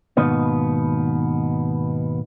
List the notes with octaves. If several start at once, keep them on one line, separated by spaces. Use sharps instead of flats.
D#2 G#2 B2 D#3 B3